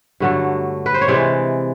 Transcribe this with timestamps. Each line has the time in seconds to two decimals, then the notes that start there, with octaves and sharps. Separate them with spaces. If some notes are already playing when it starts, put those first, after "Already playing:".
0.20 G2 D3 F#3 A3
0.86 B4
0.94 C5
1.01 C#5
1.08 C3 E3 G#3 D5